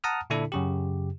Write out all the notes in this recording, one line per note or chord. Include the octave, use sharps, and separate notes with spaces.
F#5 A5 A#5 D#6 F6
A#2 D3 D4 E4 A4
F#2 C#3 G4